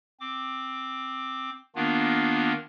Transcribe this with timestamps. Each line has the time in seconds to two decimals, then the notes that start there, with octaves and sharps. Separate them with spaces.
0.20 C4 D6
1.76 D#3 A#3 B3 D4 F4